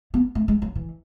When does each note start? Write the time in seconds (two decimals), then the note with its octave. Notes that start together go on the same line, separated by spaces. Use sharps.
0.14 B3
0.35 A3
0.48 G#3
0.62 F#3
0.75 E3